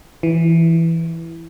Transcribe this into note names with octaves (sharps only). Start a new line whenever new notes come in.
E3